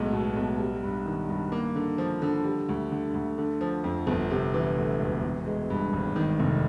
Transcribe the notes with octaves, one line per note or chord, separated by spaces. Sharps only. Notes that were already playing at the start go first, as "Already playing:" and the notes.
Already playing: B1 A2 G#3
B2
B1
G3
G2
D#3
G2
A#3
D3
F3
D3
G3
D2
D3
D2
D3
F3
F2
G1
C3
E3
D2
E1
E3
G#3
G2
G#1
D#3
F1